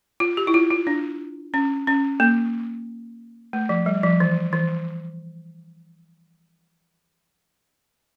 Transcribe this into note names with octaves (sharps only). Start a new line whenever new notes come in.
F4
G4
E4
F4
F4
D4
C#4
C#4
A#3
A3
F3
G3
F3
E3
E3